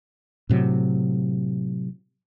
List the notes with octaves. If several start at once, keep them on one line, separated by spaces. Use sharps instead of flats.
A2 C3 F#3